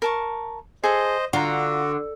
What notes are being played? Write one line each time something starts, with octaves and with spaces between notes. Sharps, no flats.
A#4 A5 C#6
G#4 A4 C5 D#5
D3 F4 F#4 A#5